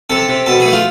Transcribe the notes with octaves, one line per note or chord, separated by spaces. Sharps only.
C3 A4
C3
B2 A4
G#4
A3
F4